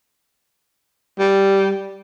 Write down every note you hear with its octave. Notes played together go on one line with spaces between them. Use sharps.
G3